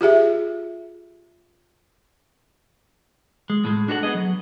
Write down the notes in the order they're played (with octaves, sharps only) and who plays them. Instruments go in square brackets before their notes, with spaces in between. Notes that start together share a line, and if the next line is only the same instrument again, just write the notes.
[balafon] F4 G4 G#4 E5
[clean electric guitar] G#3
A2 G#3
D4 F#4 A4 C#5 F#5
B3 G#4 D#5
F#3